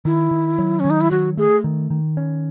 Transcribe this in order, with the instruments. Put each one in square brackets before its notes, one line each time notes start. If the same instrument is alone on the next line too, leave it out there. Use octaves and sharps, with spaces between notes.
[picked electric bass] D#3 [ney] E4
[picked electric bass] D#3
F#3
[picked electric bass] D#3 [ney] C#4
[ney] D#4
E4
[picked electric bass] F#3 [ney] F#4
[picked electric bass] A3 [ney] G#4
[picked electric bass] D#3
D#3
C#4